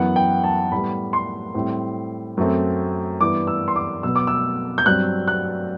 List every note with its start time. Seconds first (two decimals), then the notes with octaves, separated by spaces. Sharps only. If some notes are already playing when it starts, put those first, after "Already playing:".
Already playing: F#2 E3 B3 F#5
0.16 G5
0.44 A5
0.71 A2 G3 B3 B5
1.13 C6
1.54 A2 G3 C4
2.37 F#2 F#3 A3 C4
3.20 G2 E3 B3 D6
3.47 E6
3.68 C6
3.76 D6
4.03 B2 F#3 B3 E6
4.16 D6
4.27 E6
4.78 G6
4.86 G2 F#3 C4 F#6
5.28 F#6